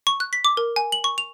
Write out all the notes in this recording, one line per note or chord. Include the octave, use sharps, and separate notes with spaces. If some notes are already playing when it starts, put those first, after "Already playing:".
C#6
F#6
B6
D6
A#4
G#5
F#7
C#6
F7